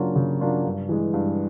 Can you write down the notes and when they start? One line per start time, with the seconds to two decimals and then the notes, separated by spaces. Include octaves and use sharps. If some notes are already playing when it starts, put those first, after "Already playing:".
Already playing: C#3 F#3 A#3 D4 F4
0.16 C#3
0.40 F#3 A#3 D4 F4
0.65 G2
0.89 E3 G#3
1.14 G2